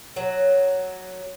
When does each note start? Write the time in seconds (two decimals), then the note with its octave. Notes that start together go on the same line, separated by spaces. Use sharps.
0.16 F#3